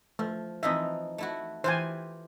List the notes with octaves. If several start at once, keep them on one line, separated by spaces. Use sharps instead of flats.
F3 A3
E3 F3 C4 D#4 D#5 E5
A3 E4 F#4
E3 F4 G4 C5 G#5